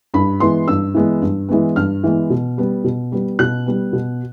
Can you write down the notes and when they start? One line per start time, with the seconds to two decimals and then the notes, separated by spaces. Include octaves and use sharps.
0.14 G2 B5
0.40 E3 G#3 B3 C6
0.68 G2 E6
0.94 E3 G#3 B3
1.22 G2
1.49 E3 G#3 B3
1.76 G2 F6
2.04 E3 G#3 B3
2.30 B2
2.58 G3 B3
2.84 B2
3.12 G3 B3
3.39 B2 F#6
3.66 G3 B3
3.93 B2